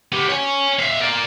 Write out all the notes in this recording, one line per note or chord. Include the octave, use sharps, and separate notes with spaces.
B3 G4
C#5 G#5
E5 F5
A#4 D5